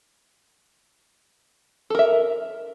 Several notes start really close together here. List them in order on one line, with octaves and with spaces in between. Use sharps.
A4 A#4 E5